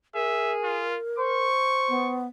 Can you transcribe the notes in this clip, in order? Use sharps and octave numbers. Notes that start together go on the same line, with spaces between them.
G#4 A#4 E5
F4
C5 C#6
B3